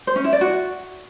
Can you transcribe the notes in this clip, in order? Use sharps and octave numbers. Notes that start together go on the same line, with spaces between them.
C5
C#4
E4
D5
F#4